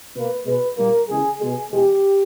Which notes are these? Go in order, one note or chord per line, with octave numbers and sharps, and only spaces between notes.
B2 A#3 B4
B2 G#3 B4
A#2 G3 A#3 A#4
E2 C#3 E3 G#3 G#4
B2 G#3 G#4
E2 B2 G#3 G4